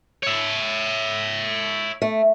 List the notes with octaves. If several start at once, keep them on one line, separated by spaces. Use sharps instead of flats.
C#5 E5
A3